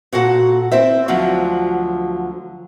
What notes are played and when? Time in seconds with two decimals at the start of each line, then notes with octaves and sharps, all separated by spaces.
0.12 A#2 F#4 A4 F#5
0.72 C4 E4 C5 E5
1.08 D2 D3 F3 F#3 F4